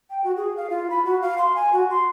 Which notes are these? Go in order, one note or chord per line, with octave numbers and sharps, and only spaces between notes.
G5
F#4
G#4
F5
F4
B5
F#4
F5
C6
G#5
F#4
C6